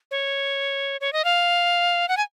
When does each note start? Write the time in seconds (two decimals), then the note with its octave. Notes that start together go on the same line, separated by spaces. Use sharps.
0.11 C#5
1.01 C#5
1.13 D#5
1.25 F5
2.09 F#5
2.17 G#5